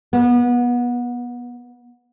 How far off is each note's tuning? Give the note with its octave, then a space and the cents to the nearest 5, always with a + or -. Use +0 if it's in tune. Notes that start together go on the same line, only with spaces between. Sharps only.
B3 -25